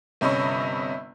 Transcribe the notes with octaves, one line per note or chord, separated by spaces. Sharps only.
G1 C3 C#4 D#5 B5 C#6